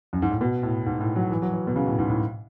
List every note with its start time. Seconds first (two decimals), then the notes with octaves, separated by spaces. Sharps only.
0.13 F#2
0.22 G#2
0.31 A2
0.41 B2
0.63 A2
0.86 G#2
1.00 A2
1.16 F#3
1.31 E3
1.42 F#3
1.52 E3
1.67 B2
1.76 C#3
1.87 A2
1.99 G#2
2.09 A2